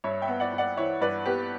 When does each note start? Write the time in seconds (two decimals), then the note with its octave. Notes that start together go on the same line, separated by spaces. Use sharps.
0.04 G2 C#5 E5
0.22 E5 G5
0.28 B3
0.40 D5 F#5
0.53 G2
0.58 D5 F#5
0.77 E3 C#5 E5
1.01 G2 B4 D5
1.26 B3 G4 B4